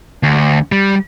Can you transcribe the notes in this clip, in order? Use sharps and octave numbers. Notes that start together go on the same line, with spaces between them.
D2
G3